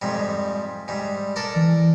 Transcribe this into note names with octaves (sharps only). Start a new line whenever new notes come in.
F2 G#2 G3
G#2 G3
A4 A#4 D5
E3